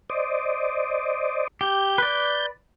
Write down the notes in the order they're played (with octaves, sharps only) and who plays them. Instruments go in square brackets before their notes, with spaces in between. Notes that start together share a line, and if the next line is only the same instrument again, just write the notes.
[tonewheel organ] C5 D5 D#5
[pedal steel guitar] G4 [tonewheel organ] G6
[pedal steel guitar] B4 D5